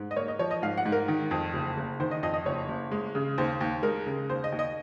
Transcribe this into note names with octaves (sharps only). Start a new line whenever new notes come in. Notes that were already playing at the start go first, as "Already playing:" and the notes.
Already playing: G#2
D#5
A#3 C#5
D#5
F3 C#5
D#5
G#2 F5
F#5
G#2
A#4
D#3
F2
F#1
F#1
D#3 C5
D#5
F2 D#5
D#5
F#1 C#5
F#1
G#3
C#3
D#2 C5
D#2
G#3 A#4
C#3
D#2 C5
D#5
D#2
D#5